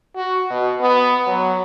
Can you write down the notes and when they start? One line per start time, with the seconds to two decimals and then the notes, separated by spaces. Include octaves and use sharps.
0.16 F#4
0.50 B2
0.81 B3
1.27 F#3